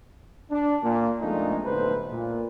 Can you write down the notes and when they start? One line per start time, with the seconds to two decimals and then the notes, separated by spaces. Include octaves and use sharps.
0.51 D4
0.83 A#2
1.22 F2 A#2 G#3 A3 D4 D#4
1.66 B1 A2 D3 B4 C5
2.11 A#2